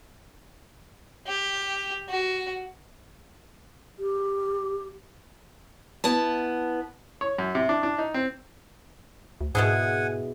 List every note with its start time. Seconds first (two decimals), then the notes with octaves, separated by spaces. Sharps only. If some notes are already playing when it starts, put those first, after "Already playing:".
1.27 G4
2.09 F#4
3.99 G4
6.04 B3 E4 A5
7.21 C#5
7.38 F#2
7.55 C3
7.69 D4
7.83 D4
7.98 D#4
8.14 C4
9.41 D2
9.55 G#2 B2 E4 G#4 F#5 G#5